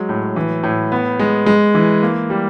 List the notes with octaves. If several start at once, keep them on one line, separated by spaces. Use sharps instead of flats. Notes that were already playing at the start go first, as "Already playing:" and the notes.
Already playing: F#3 G#3
A2
E3
A2
B3
G#3
G#3
E3
A#3
G3